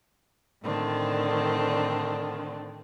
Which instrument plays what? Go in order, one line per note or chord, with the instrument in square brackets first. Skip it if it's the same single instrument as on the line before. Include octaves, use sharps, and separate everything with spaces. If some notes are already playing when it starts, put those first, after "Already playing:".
[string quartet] A2 D3 D#3 C4 D4